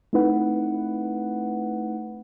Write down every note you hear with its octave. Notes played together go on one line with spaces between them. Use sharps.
A3 C4 D#4 E4 B4 F#5